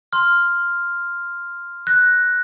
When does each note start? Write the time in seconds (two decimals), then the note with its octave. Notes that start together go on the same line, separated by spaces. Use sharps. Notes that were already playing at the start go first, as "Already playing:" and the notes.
0.13 C6 F6
1.87 F#6 A#6